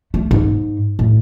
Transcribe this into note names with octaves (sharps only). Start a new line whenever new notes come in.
A3
G#2
A2